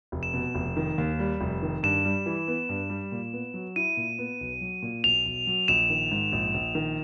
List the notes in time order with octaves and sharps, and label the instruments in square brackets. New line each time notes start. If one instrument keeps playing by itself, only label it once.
[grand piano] F1
[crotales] E7
[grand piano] B2
F1
D#3
D#2
G3
F1
D#3
[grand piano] G2 [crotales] E7
[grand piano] G3
E3
B3
G2
G3
A#2
B3
F#3
[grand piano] E4 [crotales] D#7
[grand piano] A#2
B3
B1
F#3
A#2
[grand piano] B1 [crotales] F7
[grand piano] B1
F#3
[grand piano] A#1 [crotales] E7
[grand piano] D#3
G#2
A#1
A#1
D#3